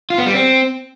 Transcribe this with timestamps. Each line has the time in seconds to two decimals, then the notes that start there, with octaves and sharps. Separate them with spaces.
0.10 F4
0.18 B3
0.26 G3
0.34 C4